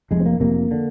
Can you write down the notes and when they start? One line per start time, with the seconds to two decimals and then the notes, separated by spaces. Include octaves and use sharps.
0.11 F1 F2 C3 G#3
0.20 C4
0.26 A#3
0.40 F1 F2 C3 A#3
0.71 D3